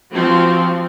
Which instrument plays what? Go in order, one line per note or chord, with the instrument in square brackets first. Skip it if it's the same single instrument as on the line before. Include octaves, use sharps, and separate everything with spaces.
[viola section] F3 C4 F#4